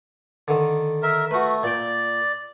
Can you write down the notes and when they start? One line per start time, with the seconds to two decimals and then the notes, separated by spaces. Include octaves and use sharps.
0.48 D3 D#3
1.03 A#4 E5
1.31 A3 F#4 B4
1.63 A#2 D5 G5